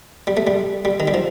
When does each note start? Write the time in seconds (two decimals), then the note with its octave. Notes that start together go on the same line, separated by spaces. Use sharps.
0.27 G3
0.37 A3
0.47 G3
0.85 G3
1.00 D#3
1.08 G3
1.14 F3